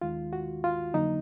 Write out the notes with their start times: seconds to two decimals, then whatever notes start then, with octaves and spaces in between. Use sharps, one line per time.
0.01 D#2 D#3 G#3 F4
0.33 F#4
0.64 F4
0.93 F2 D3 F#3 A#3 D#4